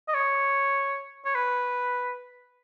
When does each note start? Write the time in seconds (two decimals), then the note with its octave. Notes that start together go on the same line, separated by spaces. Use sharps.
0.08 D#5
0.14 C#5
1.25 C#5
1.35 B4